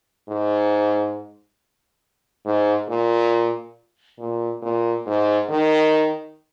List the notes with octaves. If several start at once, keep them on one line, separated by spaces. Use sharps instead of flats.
G#2
G#2
A#2
A#2
A#2
G#2
D#3